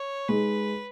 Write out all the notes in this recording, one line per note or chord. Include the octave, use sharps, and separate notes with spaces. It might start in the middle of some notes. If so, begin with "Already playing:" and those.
Already playing: C#5
G#3 D#4 G#4 B4